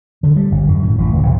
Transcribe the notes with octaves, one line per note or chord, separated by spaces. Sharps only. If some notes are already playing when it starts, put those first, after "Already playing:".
D3
G3
G1
F#2
A2
A1
D1
A#1